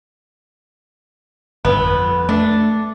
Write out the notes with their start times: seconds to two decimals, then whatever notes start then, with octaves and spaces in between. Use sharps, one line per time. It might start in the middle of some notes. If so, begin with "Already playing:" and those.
1.65 G1 F#2 B3
1.80 F2
2.29 A3 D4